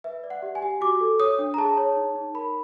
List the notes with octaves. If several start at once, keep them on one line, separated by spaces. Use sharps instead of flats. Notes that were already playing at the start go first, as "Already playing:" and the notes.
B4 E5
D5
F#5
G4
G#5
G4
F#4 D6
A4
C#5 D#6
D4
A#5
G#4 A5
C#5
D#4
D#4
A#4 B5